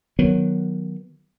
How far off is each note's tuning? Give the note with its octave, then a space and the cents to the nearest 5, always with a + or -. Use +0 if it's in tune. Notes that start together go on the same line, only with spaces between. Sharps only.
D#3 -5 F#3 +0 B3 -10